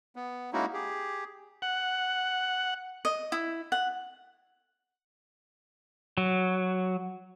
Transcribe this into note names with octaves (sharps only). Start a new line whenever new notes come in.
B3
G#3 A#3 C#4 D#4 E4 F#4
G4 G#4
F#5
D#5
E4
F#5
F#3